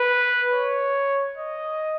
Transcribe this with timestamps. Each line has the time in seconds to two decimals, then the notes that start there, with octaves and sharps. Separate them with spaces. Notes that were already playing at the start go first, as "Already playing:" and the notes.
Already playing: B4
0.54 C#5
1.37 D#5